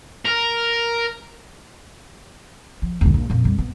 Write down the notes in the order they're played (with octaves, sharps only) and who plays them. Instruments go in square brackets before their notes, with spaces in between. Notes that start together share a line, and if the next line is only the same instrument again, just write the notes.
[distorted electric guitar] A#4
[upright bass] F3
D#1 D3
A#1
F2 A#2
F2 G3
B3